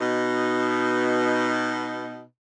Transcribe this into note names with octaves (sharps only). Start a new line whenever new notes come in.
B2 D#4